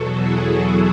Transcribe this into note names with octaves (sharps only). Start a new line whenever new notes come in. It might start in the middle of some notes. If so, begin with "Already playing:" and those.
Already playing: E2 B2 F#3 F#4 A4
E4 G#4
E4 G#4